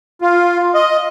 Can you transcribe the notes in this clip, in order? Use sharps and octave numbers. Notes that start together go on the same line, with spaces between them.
F4
D#5